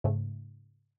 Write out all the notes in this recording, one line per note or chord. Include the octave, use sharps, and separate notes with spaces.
G#2 C#3 A3